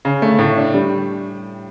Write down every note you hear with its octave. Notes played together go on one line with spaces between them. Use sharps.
C#3
A3
A2
D4
G3